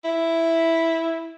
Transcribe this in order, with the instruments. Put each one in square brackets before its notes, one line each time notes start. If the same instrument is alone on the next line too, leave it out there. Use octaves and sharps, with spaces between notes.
[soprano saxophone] E4